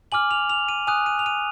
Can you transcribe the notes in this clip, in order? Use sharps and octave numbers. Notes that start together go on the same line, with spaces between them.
G#5 D6 F6 F#7
F7
F7
D#7
G#5 D#6 F#6 D#7
D#7
F7
D#7